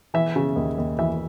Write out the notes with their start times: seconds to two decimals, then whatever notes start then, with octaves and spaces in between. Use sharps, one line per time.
0.14 E3 E5
0.36 C#3
0.56 D#2
0.78 D#2
0.99 E3 E5